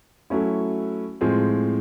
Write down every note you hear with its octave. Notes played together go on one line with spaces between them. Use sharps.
F#3 A3 C#4 E4
A2 F3 G#3 C4